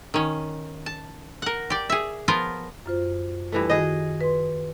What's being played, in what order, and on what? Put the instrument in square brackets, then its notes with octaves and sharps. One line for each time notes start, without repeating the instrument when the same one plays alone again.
[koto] D#3 C#4
A5
A#4 F#5
G4 D5
G#4 E5
F3 B3 F4 A#4
[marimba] F#2 F4 C5
[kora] G2 E3 A3
[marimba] D#3 F#4 [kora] G#4 D#5
[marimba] B4 C6